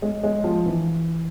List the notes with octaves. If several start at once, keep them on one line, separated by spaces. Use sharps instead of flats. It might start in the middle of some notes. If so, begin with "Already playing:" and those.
G#3
G#3
F3
E3